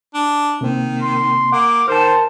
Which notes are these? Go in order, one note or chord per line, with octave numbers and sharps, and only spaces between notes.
D4
C3 D#3 A#3 C4
C6
A#3 F#5 D6
D#3 A#4 C5 A5